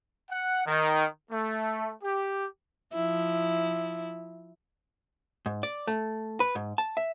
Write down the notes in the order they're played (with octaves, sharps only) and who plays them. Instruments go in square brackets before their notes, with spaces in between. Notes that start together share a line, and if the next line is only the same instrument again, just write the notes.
[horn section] F#5
D#3
A3
G4
[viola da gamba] F3 E4
[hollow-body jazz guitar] G#2
D5
A3
B4
G#2
A5
E5